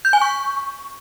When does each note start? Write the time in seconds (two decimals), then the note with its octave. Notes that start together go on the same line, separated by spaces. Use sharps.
0.05 G6
0.13 G#5
0.21 C#6